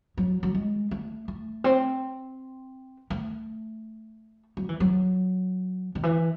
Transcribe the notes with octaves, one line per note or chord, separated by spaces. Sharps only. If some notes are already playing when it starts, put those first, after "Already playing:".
F#3
F#3
G#3
A3
A3
C4
A3
F#3
E3
F#3
D#3
E3